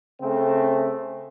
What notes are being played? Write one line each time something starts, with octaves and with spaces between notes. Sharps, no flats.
C#3 A3 C4